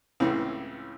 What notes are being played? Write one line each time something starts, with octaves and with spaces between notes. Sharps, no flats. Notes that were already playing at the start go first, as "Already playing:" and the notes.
C#2 A2 C#3 E3 C4